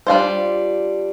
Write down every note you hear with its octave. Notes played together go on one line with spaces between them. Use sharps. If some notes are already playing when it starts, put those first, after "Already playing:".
G3 D4 F4 C5